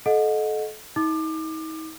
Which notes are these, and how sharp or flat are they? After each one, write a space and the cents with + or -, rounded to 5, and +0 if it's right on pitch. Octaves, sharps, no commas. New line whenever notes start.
A4 -30 D#5 +0 F#5 -30
D#4 +40 D6 +30